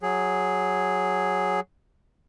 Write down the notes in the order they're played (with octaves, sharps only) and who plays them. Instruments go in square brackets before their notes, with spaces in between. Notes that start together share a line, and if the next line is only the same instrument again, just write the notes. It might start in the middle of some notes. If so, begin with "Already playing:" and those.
[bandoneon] F#3 G#4